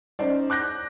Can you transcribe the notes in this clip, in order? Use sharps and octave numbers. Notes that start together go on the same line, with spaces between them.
C#4 D#4 C5 D5
D6 F#6 G6 A#6